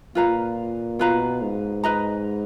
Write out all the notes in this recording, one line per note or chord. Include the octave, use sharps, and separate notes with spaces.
A#2 F4 B4 F5 A#5
B2 F4 B4 F5 A#5
G#2
B4 D#5 A#5